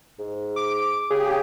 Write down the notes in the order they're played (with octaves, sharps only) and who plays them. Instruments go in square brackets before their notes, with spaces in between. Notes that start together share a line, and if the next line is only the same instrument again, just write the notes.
[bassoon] G#2
[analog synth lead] D6
[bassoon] C#3 [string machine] G4 [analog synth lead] G#4